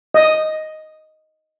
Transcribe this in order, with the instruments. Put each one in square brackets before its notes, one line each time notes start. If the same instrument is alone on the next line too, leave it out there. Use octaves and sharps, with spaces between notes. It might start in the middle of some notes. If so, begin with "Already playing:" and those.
[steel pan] D#5